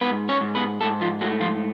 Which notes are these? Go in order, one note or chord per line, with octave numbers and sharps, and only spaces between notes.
G#2 B3 B4
C#4 C#5
G#2
B3 B4
G#2 A3 A4
F3 F4
F#3 A3 F#4
F3 F4